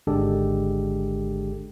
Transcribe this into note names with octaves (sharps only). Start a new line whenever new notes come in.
G#1 D3 G#3 D4 G4 A4